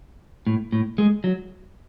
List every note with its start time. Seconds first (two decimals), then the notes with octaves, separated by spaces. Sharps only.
0.47 A2
0.72 A2
0.98 G#3
1.24 F#3